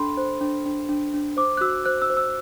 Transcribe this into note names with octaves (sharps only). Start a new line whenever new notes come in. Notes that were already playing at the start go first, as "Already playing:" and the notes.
Already playing: D4 A4 B5 C6
C5
D4
D4
D4
D4
C5 D6
F#6
F#4 E6
C5 F#6
E6
C5
E6